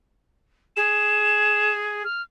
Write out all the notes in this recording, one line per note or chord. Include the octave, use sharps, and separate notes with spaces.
G#4 E7
F6